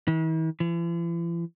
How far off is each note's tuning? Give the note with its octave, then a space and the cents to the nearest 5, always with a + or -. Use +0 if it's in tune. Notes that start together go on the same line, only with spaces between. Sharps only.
E3 -45
E3 +45